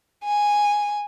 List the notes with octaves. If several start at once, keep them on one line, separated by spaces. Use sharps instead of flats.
G#5